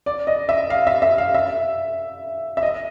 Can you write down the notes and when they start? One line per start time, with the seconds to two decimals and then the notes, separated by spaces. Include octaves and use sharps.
0.06 D5
0.27 D#5
0.49 E5
0.70 F5
0.87 E5
1.02 E5
1.18 F5
1.34 E5
2.57 E5
2.63 D#5